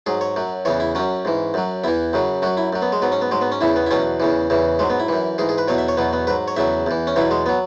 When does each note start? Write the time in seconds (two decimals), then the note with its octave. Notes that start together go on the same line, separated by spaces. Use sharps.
0.06 G#2 F#3 G#4
0.21 C#5
0.36 F#2 F#3
0.65 E2 C#3 E3 C#5
0.80 E4
0.95 F#2 F#3 C#4
1.25 G#2 E3
1.54 F#2 F#3
1.84 E2 E3 E4
2.13 F#2 C#3 F#3
2.42 F#2 F#3 F#4
2.57 E4
2.73 F#2 F#3
2.82 B3
2.92 G#3
3.02 G#2 F#3 B3
3.12 C#4
3.22 B3
3.31 G#2 F#3 G#3
3.41 B3
3.52 C#4
3.61 E2 C#3 E3 E4
3.76 B3
3.86 E4
3.91 E2 B2 F#3 C#4
4.20 E2 C#3 E3
4.50 E2 C#3 E3
4.79 G#2 F#3 G#3
4.90 B3
5.00 E4
5.09 F#2 E3
5.38 G#2 E3 G#4
5.49 G#4
5.58 B4
5.68 E2 B2 F#3 C#5
5.78 E5
5.88 C#5
5.97 E2 B2 F#3 B3
6.13 B3
6.27 G#2 F#3 B4
6.48 C#5
6.56 E2 C#3 F#3 E5
6.86 E2 E3
7.07 C#4
7.16 E2 B2 F#3 E4
7.31 G#3
7.46 F#3 B3